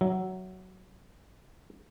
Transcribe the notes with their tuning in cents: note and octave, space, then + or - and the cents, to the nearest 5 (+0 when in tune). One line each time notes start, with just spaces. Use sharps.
F#3 +10 E5 +0